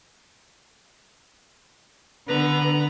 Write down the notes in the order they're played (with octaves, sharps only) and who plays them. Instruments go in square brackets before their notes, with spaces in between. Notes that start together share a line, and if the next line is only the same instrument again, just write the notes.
[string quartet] D3 B3 [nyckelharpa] B4 A#5